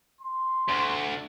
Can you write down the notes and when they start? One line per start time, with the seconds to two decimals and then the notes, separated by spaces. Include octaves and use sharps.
0.21 C6
0.69 D2